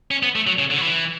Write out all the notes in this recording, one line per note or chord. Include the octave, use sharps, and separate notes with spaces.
C#4
B3
A3
F#3
C#3
D3
F#3
E3